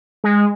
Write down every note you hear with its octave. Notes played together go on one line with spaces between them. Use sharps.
G#3